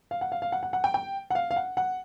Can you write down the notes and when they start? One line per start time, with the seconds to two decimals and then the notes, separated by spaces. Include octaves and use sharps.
0.11 F5
0.21 F#5
0.32 F5
0.42 F5
0.52 F#5
0.63 F#5
0.73 F#5
0.84 G5
0.94 G5
1.30 F#5
1.35 F5
1.51 F5
1.56 F#5
1.77 F#5